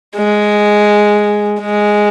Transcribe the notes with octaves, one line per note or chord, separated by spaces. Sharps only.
G#3
G#3